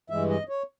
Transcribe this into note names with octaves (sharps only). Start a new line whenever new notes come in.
G2 E3 G#3 E5
D#5
C#5